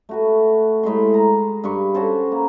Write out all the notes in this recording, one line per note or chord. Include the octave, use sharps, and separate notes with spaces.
A3 F#4 B4
A2 G#3 B5 C6
A#5
G2 B4 C#6
C#4 F#4 A4 C5
A#3